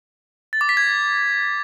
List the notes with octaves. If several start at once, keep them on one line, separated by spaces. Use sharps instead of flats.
A6
D6
B6
G#6